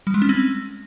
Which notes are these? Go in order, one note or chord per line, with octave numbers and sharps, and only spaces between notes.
G3
G#3
C#4
C4